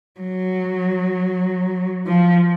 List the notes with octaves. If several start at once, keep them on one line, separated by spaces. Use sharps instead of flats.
F#3
F3